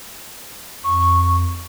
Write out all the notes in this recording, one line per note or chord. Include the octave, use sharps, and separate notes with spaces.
F2 C#6